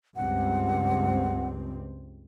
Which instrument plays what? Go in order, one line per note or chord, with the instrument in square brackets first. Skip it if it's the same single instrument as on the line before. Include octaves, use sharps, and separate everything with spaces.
[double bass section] C#2 G2 C4 [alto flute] F#5